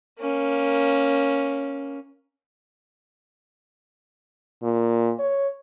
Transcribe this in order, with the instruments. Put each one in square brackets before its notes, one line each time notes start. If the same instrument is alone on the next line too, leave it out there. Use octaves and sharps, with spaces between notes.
[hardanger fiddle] A#3 C#4
[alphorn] A#2
C#5